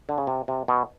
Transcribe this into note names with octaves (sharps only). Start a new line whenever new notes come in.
D3
C#3
C3
C3
B2